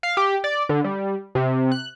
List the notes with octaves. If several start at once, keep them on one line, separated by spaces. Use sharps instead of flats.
F5
G4
D5
D3
G3
C3
F#6